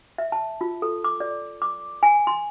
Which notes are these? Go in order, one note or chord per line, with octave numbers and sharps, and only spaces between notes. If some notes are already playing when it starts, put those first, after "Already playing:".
E5
A5
F4
A4
D6
D5
D6
G#5
C6